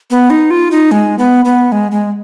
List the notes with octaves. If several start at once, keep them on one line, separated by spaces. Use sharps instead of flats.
B3
D#4
F4
D#4
G#3
B3
B3
G#3
G#3